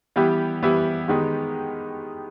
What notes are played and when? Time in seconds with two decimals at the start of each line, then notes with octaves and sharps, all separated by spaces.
0.16 E3 G3 B3 E4 G4
0.63 E3 G3 B3 E4 G4
1.08 D#3 G#3 B3 D#4 G4